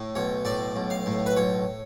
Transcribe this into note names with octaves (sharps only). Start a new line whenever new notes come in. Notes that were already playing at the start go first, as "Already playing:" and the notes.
Already playing: A2
B1 C#5
A2 D5
B1
F5
A2
B4
B1 C#5